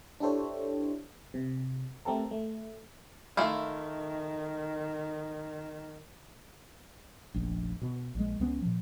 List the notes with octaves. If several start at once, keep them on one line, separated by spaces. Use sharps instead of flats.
D4 E4 G4 A4 C5 C#5
C3
A3 C4 G4 A4 A#4
A3
D#3 A3 E4 F4
F1 A#1
B2
A#1 G#3
C#2 C#3 B3 C#4
A#2 F3